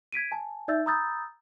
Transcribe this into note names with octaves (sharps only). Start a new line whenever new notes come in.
G#6 B6 D7 D#7
G#5 A5
D#4 D5 E5 E6 G6 A6
A#5 B5 D#6 E6 G6 A6